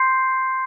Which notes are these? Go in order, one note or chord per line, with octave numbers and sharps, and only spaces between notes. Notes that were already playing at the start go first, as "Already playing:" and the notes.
Already playing: C6 G6 C7